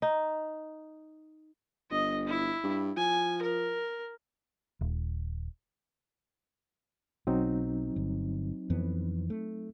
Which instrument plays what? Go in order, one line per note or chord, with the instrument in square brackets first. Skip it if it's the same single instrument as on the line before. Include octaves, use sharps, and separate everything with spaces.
[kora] D#4
[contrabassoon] G1 [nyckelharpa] D#5
[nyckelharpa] E4
[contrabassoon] G2
[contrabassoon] F3 [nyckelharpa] G#5
[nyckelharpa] A#4
[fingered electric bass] D#1
[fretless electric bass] B1 [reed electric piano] F#3 C4 D#4
[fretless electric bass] G1
F2 E3 B3
A3